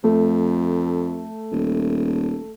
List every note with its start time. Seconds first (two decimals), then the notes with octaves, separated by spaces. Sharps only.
0.04 F2 A3
1.52 D#1